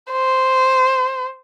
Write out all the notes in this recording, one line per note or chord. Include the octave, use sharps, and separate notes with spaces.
C5